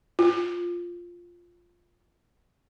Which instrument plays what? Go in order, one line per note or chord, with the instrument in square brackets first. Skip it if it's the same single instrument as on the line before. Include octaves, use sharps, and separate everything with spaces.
[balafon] F4